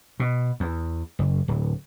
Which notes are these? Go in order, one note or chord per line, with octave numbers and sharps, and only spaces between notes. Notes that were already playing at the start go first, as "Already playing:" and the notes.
B2
E2
F#1
D1